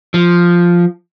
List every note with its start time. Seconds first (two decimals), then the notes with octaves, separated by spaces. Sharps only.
0.14 F3